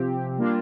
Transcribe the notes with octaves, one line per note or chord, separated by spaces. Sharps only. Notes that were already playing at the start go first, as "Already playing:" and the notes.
Already playing: C3 F3 C4 G4
G3 A#3 D4 F4